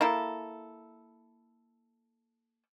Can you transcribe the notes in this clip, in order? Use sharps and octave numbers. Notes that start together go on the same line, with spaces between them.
A#3 E4 A4